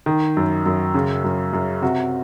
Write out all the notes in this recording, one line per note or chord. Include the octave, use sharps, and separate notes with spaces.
D#3
F#2
F#2
C#3
F#2
F#2
C3 F#4